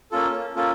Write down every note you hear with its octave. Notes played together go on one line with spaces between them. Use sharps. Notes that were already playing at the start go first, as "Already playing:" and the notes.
A#3 C#4 F4 A4
A#3 C#4 F4 A4